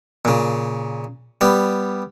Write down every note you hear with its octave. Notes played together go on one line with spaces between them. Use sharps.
A#2 C#3
G3 B3